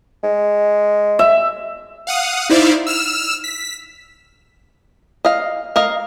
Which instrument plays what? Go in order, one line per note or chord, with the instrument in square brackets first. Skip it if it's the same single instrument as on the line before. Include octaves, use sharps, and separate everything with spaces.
[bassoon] G#3
[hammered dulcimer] E5
[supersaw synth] F5 F#5 D#6
D#4 E4 C5 D5 E5 F5
E6 F6 E7
B6
[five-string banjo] D#5 F5
A#4 D#5 F5